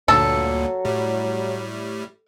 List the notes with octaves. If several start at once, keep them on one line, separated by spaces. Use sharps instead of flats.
D2 G2 A#2 F#3 A4
A2 G3